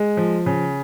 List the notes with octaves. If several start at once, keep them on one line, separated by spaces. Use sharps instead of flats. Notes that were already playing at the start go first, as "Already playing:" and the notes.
Already playing: G#3
F3
C#3